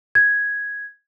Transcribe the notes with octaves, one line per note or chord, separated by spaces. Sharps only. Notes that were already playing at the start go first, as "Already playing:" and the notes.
G#6